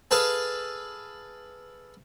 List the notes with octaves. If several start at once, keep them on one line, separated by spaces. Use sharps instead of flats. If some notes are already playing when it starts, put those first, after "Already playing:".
G#4 A4 B4 F5